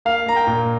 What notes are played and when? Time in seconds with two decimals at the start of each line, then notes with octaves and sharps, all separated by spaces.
0.05 A#3 F5
0.26 A#3 A#5
0.36 G5
0.47 A#2